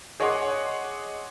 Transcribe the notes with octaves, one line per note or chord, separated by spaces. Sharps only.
G#4 C#5 D#5 F#5 C6 D6